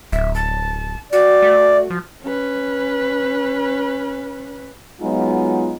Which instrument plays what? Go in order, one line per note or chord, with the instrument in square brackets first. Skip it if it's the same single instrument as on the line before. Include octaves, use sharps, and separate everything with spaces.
[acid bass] D1 [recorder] E5
[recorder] A5
[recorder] F#4 [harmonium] D5
[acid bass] A3
F3
[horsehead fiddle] C#4 B4
[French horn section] F#3 G#3 B3 D#4 F4